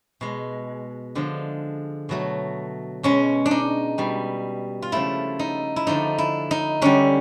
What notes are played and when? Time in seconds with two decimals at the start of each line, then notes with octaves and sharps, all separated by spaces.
0.21 B2 G#3
1.15 D3 F3 G#3
2.09 B2 F#3 A3
3.03 B2 G#3 C#4
3.46 D4
3.51 D#4
3.98 B2 G3
4.82 F4
4.92 C#3 F3 A3 E4
5.39 D#4
5.76 E4
5.87 D3 F3 A3 D#4
6.18 E4
6.51 D#4
6.82 D3 G3 C#4